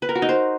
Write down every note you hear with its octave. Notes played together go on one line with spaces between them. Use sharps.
B4
A#4
F#4
D#4
C5